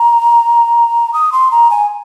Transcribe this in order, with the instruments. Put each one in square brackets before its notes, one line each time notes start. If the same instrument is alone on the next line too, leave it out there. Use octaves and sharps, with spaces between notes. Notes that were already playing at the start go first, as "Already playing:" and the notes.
Already playing: [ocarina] A#5
D#6
C6
A#5
G#5